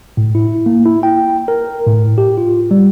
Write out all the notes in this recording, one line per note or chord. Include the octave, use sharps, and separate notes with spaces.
A2
E4
A#3
E4
G5
A#4
A2
G4
F4
G3